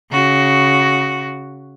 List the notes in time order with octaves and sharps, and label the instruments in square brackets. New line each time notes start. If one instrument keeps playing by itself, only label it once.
[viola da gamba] C#3 F#4